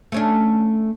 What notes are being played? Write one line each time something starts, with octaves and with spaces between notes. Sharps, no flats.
A3 C#4 D4